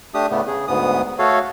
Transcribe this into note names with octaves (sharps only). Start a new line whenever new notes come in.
A3 D4 G4 D#6
A2 C#3 A3 B3
C#3 G#4
D2 G#2 B3 D#6
A3 F#4 A4 C#5 F5